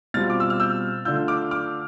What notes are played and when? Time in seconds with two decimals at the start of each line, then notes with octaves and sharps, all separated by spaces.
0.14 B2 G3 C4 F4 F6 A6
0.30 D6
0.40 E6
0.50 F6
0.60 E6 G6
1.05 D3 A3 D4 F4 E6 G6
1.28 D6 F6
1.51 D6 F6